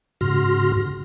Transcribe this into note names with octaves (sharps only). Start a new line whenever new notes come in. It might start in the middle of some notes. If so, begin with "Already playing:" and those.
G#2 C#3 F#4 C6 F6 A#6